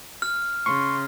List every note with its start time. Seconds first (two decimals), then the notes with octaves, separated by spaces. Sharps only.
0.22 F6
0.66 C#3 C6 C#6